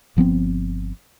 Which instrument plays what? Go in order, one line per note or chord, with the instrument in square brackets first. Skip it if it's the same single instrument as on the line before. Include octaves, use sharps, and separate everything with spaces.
[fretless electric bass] G1 F3 B3 C4